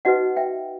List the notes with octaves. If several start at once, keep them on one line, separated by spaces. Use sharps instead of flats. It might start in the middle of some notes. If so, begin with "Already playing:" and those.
D#4 F#4 B4 D#5 F#5
E5 G5